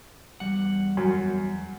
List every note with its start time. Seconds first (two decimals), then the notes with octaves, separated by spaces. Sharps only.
0.40 E2 G3 F#5
0.97 F#2